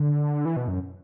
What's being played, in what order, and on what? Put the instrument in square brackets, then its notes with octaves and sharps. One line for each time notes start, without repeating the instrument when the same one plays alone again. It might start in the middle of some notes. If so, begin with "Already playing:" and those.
Already playing: [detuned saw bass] D3
E3
B2
F#2